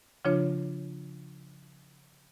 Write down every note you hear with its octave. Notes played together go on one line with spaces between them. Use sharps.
C#3 F3 D4 F4 C#5